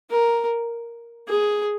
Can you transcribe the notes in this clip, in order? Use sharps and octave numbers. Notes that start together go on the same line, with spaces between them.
A#4
G#4